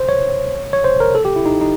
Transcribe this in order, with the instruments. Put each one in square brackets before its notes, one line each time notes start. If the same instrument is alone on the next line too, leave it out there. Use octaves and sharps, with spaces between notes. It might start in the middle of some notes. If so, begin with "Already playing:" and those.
Already playing: [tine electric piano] C5
C#5
C#5
C5
A#4
A4
G4
E4
D#4
D#4